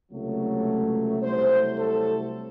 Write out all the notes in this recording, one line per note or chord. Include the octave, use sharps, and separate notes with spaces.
C#2 C3 F#3 A3
C2 C3 F#3 A3 C5
A4